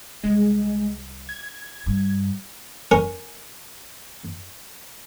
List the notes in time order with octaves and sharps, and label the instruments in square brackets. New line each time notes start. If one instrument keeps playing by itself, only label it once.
[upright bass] C2 [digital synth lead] G#3
[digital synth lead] G#6
[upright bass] G2
[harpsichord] C#4 A#4